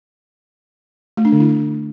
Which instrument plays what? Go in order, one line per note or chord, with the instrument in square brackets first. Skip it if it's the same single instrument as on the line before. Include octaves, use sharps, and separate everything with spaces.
[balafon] A3
D4
D3
E4